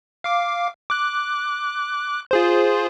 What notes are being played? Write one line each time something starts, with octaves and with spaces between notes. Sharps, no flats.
F5 D6
D6 F#6
F4 G#4 C5